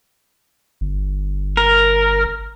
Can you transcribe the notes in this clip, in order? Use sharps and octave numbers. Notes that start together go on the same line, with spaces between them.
G1
A#4